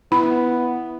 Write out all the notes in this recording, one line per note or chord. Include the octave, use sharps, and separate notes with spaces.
B3 E4 B5